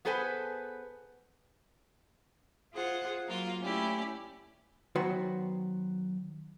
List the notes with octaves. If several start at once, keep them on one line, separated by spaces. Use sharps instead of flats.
B3 G#4 A4 B4 C5 G#5
F4 G#4 C5 F#5
F#3 A#3 F4
A3 C#4 E4 G4 D5
D#3 F#3 B3 F#4 B4 C5